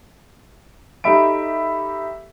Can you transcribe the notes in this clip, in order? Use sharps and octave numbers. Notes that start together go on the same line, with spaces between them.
D#4 G4 A4 E5 B5 D7